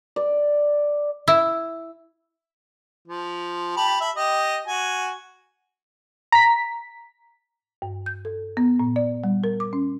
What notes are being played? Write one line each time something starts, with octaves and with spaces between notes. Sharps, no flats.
D5
E4
F3
G4 A5 B5
E5 B5
G4 D#5
F#4 G#5
A#5 B6
G2
G6
A4
B3
A#2
D5
G3
A#4
D6
C#4